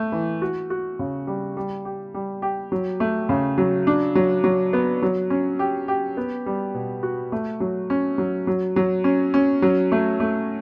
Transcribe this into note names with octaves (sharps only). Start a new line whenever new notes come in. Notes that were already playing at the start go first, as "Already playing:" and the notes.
Already playing: A3
E3
F#4
F#4
C#3
G3
G3
G4
G3
G4
F#3
A3
C#3
F#3
D4
F#3
F#3
B3
F#3
C#4
G4
G4
B3
G3
B2
F#4
A3
F#3
C#4
F#3
F#3
F#3
C#4
C#4
F#3
A3
A3